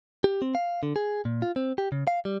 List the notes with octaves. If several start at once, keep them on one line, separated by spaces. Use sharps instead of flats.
G4
C4
F5
D3
G#4
A#2
F4
C4
G4
C#3
F5
G3